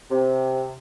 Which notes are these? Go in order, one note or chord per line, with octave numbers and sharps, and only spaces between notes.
C3